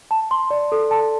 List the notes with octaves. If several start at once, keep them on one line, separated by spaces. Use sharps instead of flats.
A5
C6
D5
A4
A5